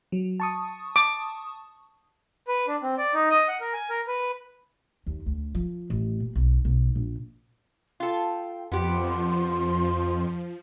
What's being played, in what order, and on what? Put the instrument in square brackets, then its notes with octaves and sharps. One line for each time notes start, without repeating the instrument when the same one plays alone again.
[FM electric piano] F#3
A5 C#6 D#6
[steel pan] D6
[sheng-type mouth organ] B4
D4
C4
D5
D#4
D#5
F#5
A#4
G#5
A#4
B4
[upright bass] D#2
D2
F3
A1
A#2
B1
B1
A#1
[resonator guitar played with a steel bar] F4 A4 [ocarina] G5
[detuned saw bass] F2 [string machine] F3 [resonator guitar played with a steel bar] B3 G4 [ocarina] C6